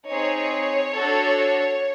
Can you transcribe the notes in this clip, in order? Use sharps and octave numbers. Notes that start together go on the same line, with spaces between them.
C4 D#4 G#4 C#5
D4 F#4 A4